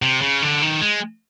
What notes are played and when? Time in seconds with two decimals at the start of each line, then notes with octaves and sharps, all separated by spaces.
0.02 C3
0.22 C#3
0.42 D3
0.62 D#3
0.81 G#3